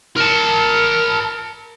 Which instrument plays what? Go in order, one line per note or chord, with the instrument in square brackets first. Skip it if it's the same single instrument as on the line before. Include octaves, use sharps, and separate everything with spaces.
[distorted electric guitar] A#4 A5